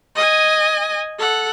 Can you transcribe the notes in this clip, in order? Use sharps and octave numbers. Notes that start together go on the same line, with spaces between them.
D#5 G#5
A4 F#5